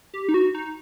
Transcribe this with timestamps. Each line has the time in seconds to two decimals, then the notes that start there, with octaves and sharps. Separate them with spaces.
0.14 G4
0.29 D#4
0.34 F#4
0.55 D#4